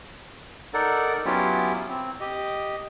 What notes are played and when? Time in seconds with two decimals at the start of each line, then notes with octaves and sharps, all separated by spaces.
0.74 D#4 A4 A#4 D5 F#5
1.25 F#3 B3 C#4 E4 F4 G4
1.89 C4
2.20 G4 D#5